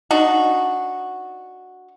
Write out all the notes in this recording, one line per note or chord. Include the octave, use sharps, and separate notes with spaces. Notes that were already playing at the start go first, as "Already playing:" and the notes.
D4 D#4 F#4